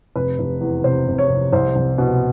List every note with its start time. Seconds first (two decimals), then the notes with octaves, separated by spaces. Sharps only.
0.16 F1 B4
0.39 F1
0.61 E2
0.84 C3 C5
1.08 F1
1.18 C#5
1.30 F1
1.53 C2 C5
1.76 C2
1.98 B2